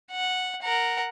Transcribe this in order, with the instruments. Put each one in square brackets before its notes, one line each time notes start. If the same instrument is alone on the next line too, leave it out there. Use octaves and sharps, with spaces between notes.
[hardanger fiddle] F#5
A#4 F#5